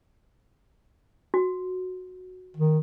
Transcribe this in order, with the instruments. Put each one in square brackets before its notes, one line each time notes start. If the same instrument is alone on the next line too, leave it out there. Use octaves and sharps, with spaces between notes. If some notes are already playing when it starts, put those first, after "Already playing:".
[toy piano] F#4
[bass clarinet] D#3